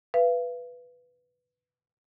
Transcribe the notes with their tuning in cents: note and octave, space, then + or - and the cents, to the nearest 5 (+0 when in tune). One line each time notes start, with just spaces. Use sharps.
B4 +0 F5 -40